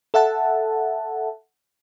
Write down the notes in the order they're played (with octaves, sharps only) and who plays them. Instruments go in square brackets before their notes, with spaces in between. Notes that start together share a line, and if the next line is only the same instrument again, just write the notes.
[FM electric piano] A4 E5 F#5 A5